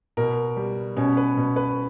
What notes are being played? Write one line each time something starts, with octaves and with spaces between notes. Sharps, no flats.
B2 A#4
G3
B2 C#4
B4
B2
B4